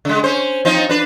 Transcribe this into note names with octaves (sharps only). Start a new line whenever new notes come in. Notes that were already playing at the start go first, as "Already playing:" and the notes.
C#3 G#3
C#4 C5
F3 C4 D#4
D4 B4